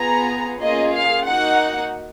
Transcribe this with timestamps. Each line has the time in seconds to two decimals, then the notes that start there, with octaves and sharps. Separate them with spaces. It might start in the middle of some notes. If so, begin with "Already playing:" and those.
Already playing: B3 F4 G#4 A#5
0.60 A#3 C#4 F4 G#4 D#5
0.94 F5
1.27 A#3 D#4 F#4 F#5